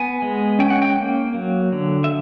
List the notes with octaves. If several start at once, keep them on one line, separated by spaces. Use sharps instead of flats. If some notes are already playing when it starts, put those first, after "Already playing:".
Already playing: B3 G#5
G#3
C#4 G5
F#5
G5
A#3
F#3
D3
E5